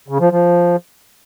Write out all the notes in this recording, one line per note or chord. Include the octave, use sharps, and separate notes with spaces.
C#3
F3
F3